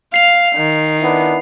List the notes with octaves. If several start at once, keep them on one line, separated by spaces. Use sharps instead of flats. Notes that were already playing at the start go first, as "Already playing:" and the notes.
F5 C7 F7
D#3
B3 D4 E4